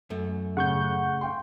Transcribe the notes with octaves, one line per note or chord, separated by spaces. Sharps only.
F#2 A3
A2 C#3 F#5 C#6 G6
F5 G5 C6